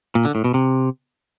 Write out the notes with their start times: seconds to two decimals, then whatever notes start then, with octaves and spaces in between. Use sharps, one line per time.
0.15 A#2
0.25 D3
0.35 A2
0.44 B2
0.54 C3